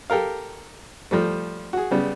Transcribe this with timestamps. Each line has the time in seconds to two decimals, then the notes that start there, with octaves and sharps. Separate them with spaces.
0.10 G4 A4 A#4 F5
1.11 F3 G3 A3
1.73 F#4 G#4
1.91 C#3 G3 B3